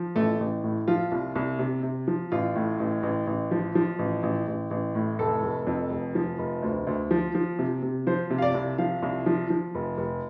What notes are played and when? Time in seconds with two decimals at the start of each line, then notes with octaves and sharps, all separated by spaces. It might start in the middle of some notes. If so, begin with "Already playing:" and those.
Already playing: F3
0.15 A1 A3
0.40 A1
0.64 A2
0.88 F3 F4
1.12 C2
1.36 C2
1.59 C3
1.83 C3
2.08 F3
2.32 A1 F4
2.56 A2
2.80 A1
3.03 A1
3.27 A1
3.51 F3
3.75 F3
3.99 A1
4.23 A1
4.48 A1
4.71 A1
4.95 A2
5.19 F1 A4
5.43 F1
5.67 F2
5.91 F1
6.15 F3
6.39 F1
6.63 D2
6.87 D2
7.11 F3
7.35 F3
7.59 C3
7.82 C3
8.07 F3 C5
8.30 C3
8.38 F5
8.42 D5
8.54 C2
8.78 F3 F5
9.03 C2
9.26 F3
9.50 F3
9.75 F1
9.98 F1